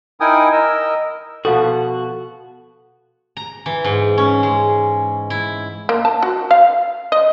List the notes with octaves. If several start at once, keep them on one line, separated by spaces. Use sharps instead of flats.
D#4 E4 A#4 G5 G#5 D#6
A#4 D#5 E6
B2 F3 F#4 A4 F5 F#5
A#5
E3
G#2
C#4
G#3
E4
A#3
A5
F#4
F5
D#5